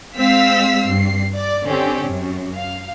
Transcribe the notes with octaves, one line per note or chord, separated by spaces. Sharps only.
G#3 C4 F5 E6 B6
G2 C7
D5
D3 C4 C#4 G4
F#2
F5